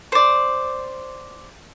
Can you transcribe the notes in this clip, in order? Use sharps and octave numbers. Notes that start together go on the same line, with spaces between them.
C5 D5